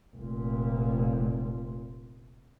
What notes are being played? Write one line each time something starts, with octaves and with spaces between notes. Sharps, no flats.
F1 A#2